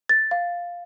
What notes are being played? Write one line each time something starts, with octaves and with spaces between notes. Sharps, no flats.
A6
F5